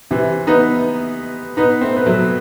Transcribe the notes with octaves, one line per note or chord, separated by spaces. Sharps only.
C3 E3
B3 D#4
B3 D#4
A3 C4
B3
F#3 A3